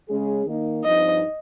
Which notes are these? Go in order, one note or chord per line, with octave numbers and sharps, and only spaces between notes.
C#3 G#3 C#4 G#4
D#3 A#3 D#4
G2 F3 C4 D#4 D#5